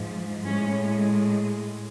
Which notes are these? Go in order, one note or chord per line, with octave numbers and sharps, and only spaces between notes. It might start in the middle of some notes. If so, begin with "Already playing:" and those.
Already playing: G#2 F3
A2 G#3 C#4